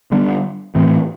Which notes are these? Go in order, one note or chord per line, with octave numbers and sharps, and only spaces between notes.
D3 G3 B3 D4
A2 E3 A3 C4